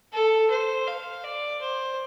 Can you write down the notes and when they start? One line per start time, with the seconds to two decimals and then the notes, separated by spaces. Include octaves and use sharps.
0.12 A4
0.50 C5
0.87 F5
1.23 D5
1.61 C5